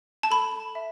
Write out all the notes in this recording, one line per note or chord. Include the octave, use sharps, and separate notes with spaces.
A5
A4 B5
E5